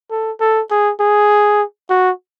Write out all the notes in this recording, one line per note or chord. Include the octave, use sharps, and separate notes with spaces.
A4
A4
G#4
G#4
F#4